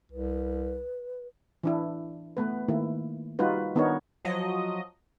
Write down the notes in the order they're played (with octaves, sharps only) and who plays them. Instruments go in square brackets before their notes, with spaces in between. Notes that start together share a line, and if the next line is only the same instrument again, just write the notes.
[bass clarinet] C2 [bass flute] B4
[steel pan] E3 D4 E4
A3 B3 B4
D#3 A3 A#3 E4
G3 D#4 F4 F#4 B4
D#3 B3 D4 D#4 A#4 C#5
[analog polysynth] F3 F#3 D#5